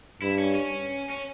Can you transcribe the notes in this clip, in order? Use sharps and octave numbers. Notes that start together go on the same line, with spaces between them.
G2 E4
C#4
C#4
C#4